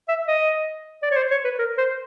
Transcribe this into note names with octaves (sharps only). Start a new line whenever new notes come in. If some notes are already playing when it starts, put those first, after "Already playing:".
E5
D#5
D5
C#5
C5
C#5
B4
A#4
C5